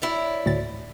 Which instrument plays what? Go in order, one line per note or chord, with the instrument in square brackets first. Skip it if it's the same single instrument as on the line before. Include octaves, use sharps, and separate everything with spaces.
[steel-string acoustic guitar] E4 C#5 D5
[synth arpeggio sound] D2 A2 A6